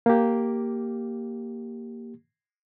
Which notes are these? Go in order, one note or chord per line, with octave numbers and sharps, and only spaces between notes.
A#3 G4